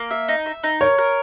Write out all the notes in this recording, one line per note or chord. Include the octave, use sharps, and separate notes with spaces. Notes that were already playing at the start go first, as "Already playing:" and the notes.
Already playing: A#3
E5
D#4
E5
D#4
A#4 C#5
A#4